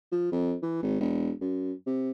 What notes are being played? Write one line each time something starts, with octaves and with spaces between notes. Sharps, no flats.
F3
F2
E3
G#1
E1
F#2
C3